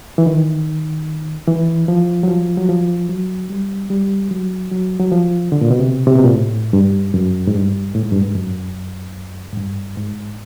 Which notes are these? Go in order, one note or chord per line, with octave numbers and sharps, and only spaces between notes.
E3
D#3
E3
F3
F#3
F3
F#3
F3
F#3
G3
G3
F#3
F#3
F#3
F3
D3
A#2
B2
C3
C3
B2
A#2
A2
G2
F#2
G#2
G2
A2
G#2
G2
G#2
F#2
G#2
G2
G#2